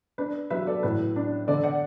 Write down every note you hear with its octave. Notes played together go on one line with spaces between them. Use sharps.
D4 B4
F#3 B4 E5
A4 D5
A2 B4
D4
D3 A4 D5
D5 F#5